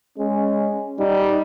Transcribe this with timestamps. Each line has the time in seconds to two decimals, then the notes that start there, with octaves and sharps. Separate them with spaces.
0.19 G#3 C#4
0.99 G3 D#4